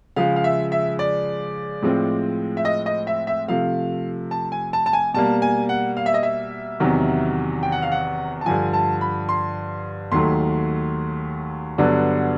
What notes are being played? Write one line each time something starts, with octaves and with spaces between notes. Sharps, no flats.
C#3 F3 G#3 F5
F5
E5
E5
D5
A2 F3 G#3 C4
E5
D#5
D#5
E5
E5
C3 F3 A3 F5
A5
G#5
A5
A5
G#5
B2 G3 A#3 A5
G#5
F#5
F5
E5
D#5
E5
E2 C3 D#3 F#3
G5
F#5
F5
F#5
A5
G2 D3 F3 G#5
A5
B5
C6
D#2 D#3 F#3 A3 C6
G2 D3 F#3 B3 D4